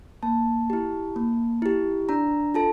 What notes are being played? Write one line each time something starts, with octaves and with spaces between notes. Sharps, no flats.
A#3 A5
E4 G4
A#3
E4 G4
D4 A#5
F4 A4 A5